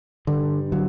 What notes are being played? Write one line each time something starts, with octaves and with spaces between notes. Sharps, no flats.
G2 D3
D3 F#3